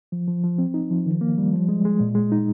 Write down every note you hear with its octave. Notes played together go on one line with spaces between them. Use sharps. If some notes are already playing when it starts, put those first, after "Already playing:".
F3
F3
F3
C4
D#4
F3
D#3
A#3
G3
F3
G#3
G#3
A#2
G#3
D#4